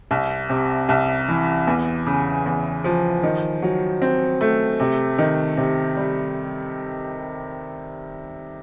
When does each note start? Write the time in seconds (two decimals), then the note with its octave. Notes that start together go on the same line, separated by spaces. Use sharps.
0.11 C2
0.49 C3
0.89 C2
1.28 E3
1.67 E2
2.07 C#3
2.46 E2
2.84 F3
3.23 D#3
3.62 F#3
4.02 C4
4.41 A3
4.80 C3
5.18 D#3
5.57 C3
5.97 G3